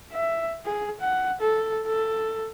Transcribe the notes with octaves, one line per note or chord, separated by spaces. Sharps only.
E5
G#4
F#5
A4
A4